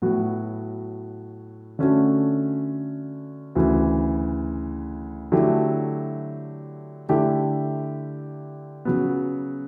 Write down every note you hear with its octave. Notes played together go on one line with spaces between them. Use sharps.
A2 F#3 B3 F#4
D3 A3 C#4 F#4
D2 C#3 E3
D3 F#3 A3 E4 G4
D3 A3 E4 G4
C#3 F#3 B3